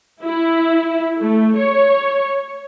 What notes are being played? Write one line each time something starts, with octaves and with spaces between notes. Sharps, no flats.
E4
A3
C#5